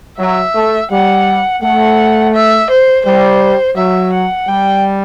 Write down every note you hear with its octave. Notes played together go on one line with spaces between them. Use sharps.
F#3 E5
A3
G3 F#5
A3 F#5
E5
C5
G3 C5
F#3 E5
F#5
G3 G5